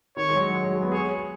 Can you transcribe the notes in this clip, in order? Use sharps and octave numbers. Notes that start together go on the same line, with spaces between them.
D#3 C#5
G#3
F#3
G#3
F#3
G#3
B3
G#4 C#5